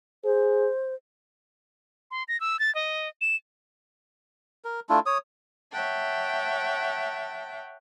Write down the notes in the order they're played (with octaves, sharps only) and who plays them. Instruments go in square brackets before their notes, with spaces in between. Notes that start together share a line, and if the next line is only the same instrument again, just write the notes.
[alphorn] G#4 [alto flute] C5
[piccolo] C6
A#6
E6
A6
D#5
E7
[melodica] A#4
A3 D4 E4 F4
C#5 D#6
[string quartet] C#5 E5 F#5 G5 A5